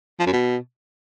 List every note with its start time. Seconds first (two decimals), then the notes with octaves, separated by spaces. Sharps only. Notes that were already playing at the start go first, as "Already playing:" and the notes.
0.20 F3
0.26 F#2
0.33 B2